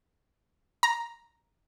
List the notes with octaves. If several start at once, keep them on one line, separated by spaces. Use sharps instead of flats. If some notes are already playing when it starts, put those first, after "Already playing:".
A#5